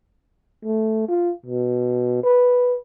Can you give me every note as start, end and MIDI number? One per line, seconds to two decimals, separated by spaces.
0.65 1.04 57
1.08 1.31 65
1.46 2.19 47
2.23 2.76 71